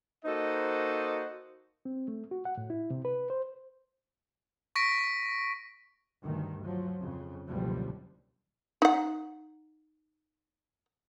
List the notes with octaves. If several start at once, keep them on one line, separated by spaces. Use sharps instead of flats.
A#3 D#4 F#4 A4 C5 D#5
C4
A3
F#4
F#5
A2
E4
C3
B4
C5
C#6 A#6 B6 D7
D2 G2 D#3
F3 F#3
F2 C#3
F#1 C#2 B2 D3 F3 G3
D#4 F#5